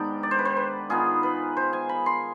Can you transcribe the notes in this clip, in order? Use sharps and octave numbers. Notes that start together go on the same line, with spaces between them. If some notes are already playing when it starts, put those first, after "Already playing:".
Already playing: G#2 D#3 B3 D4 G5
D5
C5
B4
C5
B4
D#3 B3 F4 G#4
B4
C5
G#5
B5
C6